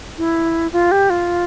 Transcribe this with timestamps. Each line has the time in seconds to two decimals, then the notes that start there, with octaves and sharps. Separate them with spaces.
0.18 E4
0.73 F4
0.92 G4
1.10 F4